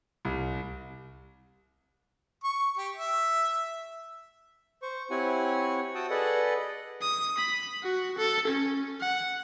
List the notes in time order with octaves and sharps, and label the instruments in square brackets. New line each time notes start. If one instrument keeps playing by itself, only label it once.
[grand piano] C2
[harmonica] C#6
G4
E5
[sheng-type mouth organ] C5 C#6
C4 E4 G4 C#5 F#5 G#5
F#4 G5 A5 D#6 E6
G#4 A4 B4 D5 D#5 F#5
[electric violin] D#6
B5
F#4
A4
C#4
F#5